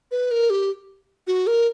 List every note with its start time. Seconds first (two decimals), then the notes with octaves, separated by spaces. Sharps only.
0.11 B4
0.31 A#4
0.50 G4
1.27 F#4
1.47 A#4